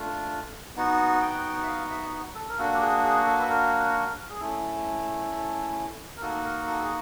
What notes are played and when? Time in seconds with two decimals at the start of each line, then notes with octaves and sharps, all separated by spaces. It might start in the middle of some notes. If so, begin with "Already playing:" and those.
Already playing: A3 D4 F4
0.76 B3 D#4 F#4
1.22 G5
1.63 E5
1.67 F5
1.90 E5
2.35 A4
2.49 A#4
2.58 A#3 D4 F#4 A4
2.74 G4
2.81 G#4
3.03 G#4
3.26 A4
3.39 B4
3.50 A#4
4.30 G#4
4.40 A3 C#4 E4 A4
6.17 A#4
6.21 A#3 D#4 F#4 A4
6.44 A#4
6.67 A4
6.80 G#4